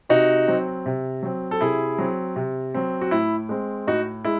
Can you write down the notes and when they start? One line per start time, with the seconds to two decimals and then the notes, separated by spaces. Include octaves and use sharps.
0.09 C3 D#4 F#4
0.48 F#3 C4
0.86 C3
1.23 F#3 C4
1.51 A4
1.61 C3 E4 G#4
1.98 F#3 C4
2.36 C3
2.74 F#3 C4
3.01 F#4
3.11 A2 E4
3.49 G#3 C4
3.87 A2 D#4 F#4
4.24 G#3 E4